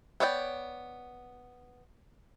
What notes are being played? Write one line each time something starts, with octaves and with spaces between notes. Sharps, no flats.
B3 C#5 D5 F5 G5